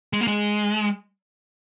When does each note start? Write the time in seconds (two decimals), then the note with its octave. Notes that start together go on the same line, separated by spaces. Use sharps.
0.13 G#3
0.21 A#3
0.28 G#3